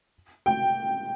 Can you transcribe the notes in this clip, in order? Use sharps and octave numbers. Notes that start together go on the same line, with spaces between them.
G5